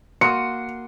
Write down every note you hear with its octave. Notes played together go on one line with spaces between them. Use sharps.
A#3 F#4 C6 D#6 C#7